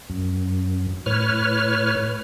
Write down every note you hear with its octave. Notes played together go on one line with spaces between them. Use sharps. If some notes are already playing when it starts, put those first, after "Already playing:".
F#2
A2 B4 C#5 F6